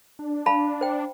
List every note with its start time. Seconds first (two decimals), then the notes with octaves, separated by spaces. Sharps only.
0.19 D4
0.46 F5 A5 B5
0.81 C5 G5